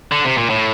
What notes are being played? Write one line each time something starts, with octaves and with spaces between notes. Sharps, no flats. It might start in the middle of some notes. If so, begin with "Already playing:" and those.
D3
C3
A#2
A2